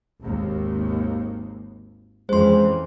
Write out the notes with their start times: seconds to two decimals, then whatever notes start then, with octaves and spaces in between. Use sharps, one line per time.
0.21 G#1 D#2
2.29 F2 E3 G#3 C#4 C5 C6